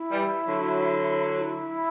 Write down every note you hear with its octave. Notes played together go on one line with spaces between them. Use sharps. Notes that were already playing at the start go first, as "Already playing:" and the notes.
Already playing: E4
E3 G3
D3 F#3
F#4
E4